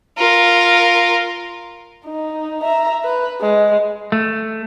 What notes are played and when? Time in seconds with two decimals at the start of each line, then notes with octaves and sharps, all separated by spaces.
0.18 F4 A#4
2.05 D#4
2.62 E5 A#5
3.03 B4
3.41 G#3
4.12 A3